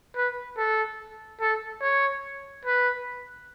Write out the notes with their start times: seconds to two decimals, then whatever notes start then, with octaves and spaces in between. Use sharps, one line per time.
0.16 B4
0.57 A4
1.41 A4
1.82 C#5
2.65 B4